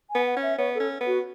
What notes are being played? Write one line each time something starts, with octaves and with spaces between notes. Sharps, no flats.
G#5
B3
F#5
C#4
E5
B3 C#5
C#4 A4
B3
F#4